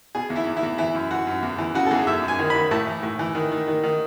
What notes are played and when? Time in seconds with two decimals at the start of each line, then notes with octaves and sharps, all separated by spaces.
0.15 B2 G#4
0.30 E2
0.36 E4
0.46 E2
0.57 E4
0.63 E2
0.78 E3 E4
0.94 F#2
1.11 E3 F#4
1.27 F#2
1.43 E2
1.58 E3
1.75 C#3 F#4
1.86 A4
1.91 E2 G#4
2.07 F#2 E5
2.22 F#2
2.28 G#5
2.39 D#3
2.50 D#3 B5
2.71 A2 A5
2.87 E3
3.03 A2
3.19 E3
3.35 D#3
3.52 D#3
3.68 D#3
3.83 D#3